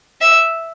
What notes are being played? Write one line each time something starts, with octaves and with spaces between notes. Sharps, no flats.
E5